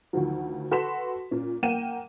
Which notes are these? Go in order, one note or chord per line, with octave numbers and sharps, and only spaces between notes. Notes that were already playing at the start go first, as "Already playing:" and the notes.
D2 D#3 F3 F#3
F#4 A4 B4 C6 B6 E7
A#2 C#4
A#3 F#5 G5 D#7 E7